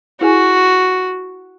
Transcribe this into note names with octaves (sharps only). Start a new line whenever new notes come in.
E4 F#4 G#4 G#5